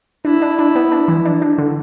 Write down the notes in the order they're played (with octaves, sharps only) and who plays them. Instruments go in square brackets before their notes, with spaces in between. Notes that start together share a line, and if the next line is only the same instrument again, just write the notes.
[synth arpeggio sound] D4 [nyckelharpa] E4
[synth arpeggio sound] D4
D4
B3
D4
E3
D4
D4
D3